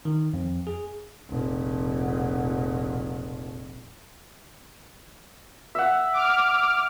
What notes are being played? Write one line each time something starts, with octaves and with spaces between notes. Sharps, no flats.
D#3
F2
G#4
F1 A#1
E5 F#5
D6 F6